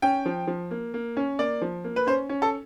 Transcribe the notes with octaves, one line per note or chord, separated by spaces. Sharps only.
C#4 G5
F3
F3
A#3
A#3
C#4
A#3 D5
F3
A#3
B4
C#4 C5
C#4
A4